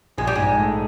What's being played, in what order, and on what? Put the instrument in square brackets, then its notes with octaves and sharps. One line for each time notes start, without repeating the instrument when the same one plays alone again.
[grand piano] A#1 [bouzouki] G#3
[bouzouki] G3
[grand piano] G#2 [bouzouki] G#3
[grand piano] A3